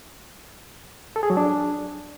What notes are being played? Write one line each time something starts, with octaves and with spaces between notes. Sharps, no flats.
A4
G#4
F#3
D4